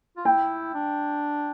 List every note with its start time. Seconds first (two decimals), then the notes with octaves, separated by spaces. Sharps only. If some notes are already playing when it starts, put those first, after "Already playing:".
0.17 F4
0.25 E4 G5
0.74 D4